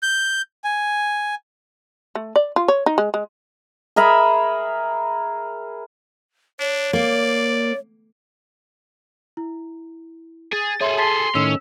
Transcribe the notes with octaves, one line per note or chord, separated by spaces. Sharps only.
G6
G#5
A3
D5
F4
C#5
D#4
G#3
G#3
G#4 A#4 E5 B5
D4 C#5
A#3 D5
E4
G#4 A6
G#4 A4 C#5 E5 C6
A5 C6 A6 B6
A2 D#3 C#4 E6 E7